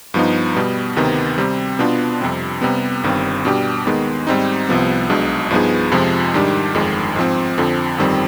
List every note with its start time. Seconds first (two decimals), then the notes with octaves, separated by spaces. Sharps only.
0.14 G2 F3 B3 D#4
0.55 B2 G3 B3
0.96 D2 C3 D#3 B3
1.38 C3 G3 C4
1.79 B2 B3 D4 F4
2.21 F2 C3 G3 C4
2.61 C3 G3 B3
3.03 G1 G2 D#3 G3 C4
3.45 B2 G3 D4 G4
3.85 D#2 D#3 G#3 B3
4.27 G#2 G3 C4 D#4
4.69 C2 C3 F3 B3
5.09 B1 B2 G#3 D4
5.51 G2 F3 B3 D#4 G#4
5.92 F2 C3 F3 G#3
6.34 G#2 D#3 G3 D4 G4
6.75 G1 F2 D#3 G#3
7.16 G#2 F3 C4
7.58 F2 D3 F3 C4
7.98 G1 F2 D#3 G3 C4